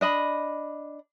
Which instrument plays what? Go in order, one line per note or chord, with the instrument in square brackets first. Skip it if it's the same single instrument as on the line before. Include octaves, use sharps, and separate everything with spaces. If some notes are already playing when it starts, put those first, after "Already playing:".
[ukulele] D4 D#5 B5